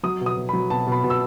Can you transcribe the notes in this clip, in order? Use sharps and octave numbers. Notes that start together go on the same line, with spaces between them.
F#3 D#6
B2
D#6
B2
F#3 B5
B2 A5
B2 B5
B2
E6